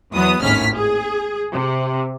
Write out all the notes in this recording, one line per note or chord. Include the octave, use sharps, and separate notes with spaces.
E2 F#3 B3 D#6
G#1 D#2 A2 C#4 F6 B6
G#4
C3